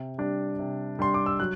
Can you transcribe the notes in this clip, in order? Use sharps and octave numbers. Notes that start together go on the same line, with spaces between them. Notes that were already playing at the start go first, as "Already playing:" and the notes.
Already playing: C3
G3 D4
C3
G3 D4 C6
D6
E6
F#3 F#6